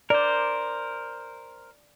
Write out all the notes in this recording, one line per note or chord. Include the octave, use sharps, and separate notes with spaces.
A#4 C5 D5